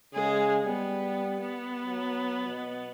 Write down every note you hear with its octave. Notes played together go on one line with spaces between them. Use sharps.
C#3 G#3 G#4
G3 B3
B3
F#3
B2